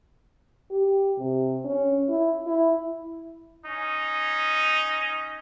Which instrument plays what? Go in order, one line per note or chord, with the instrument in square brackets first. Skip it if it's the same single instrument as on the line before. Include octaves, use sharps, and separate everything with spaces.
[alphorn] G4
C3
C#4
E4
E4
[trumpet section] C#4 D#4